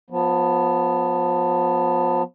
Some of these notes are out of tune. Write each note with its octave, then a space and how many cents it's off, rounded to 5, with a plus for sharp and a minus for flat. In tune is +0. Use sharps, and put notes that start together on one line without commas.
F3 +30 B3 +0